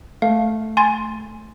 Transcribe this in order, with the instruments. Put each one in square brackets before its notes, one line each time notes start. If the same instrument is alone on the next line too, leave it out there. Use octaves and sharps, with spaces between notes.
[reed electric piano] A3 [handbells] F5
[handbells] G#5 C6 A6